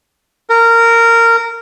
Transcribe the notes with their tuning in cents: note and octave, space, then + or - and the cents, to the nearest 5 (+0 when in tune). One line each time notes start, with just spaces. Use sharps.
A#4 -15